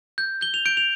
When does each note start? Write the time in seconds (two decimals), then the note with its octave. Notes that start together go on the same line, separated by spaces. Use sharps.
0.18 G6
0.41 G6 G7
0.54 F7
0.65 G6 D7
0.77 F7